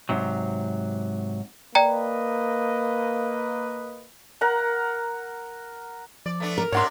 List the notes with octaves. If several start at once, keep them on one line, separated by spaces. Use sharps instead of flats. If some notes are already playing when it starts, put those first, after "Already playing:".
G#2 C3 F#3
A#3 B4 D5 D#5 G5 A#5
A#4 F#5 A#5
F3 D5
A3 B3 D4
A#4
G#2 C3 D4 C#5 F#5 C6